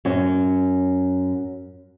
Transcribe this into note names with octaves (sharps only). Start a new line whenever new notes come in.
F#2 C#5